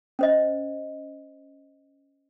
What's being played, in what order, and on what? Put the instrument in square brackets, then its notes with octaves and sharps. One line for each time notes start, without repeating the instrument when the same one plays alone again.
[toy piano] C#4 C5 D#5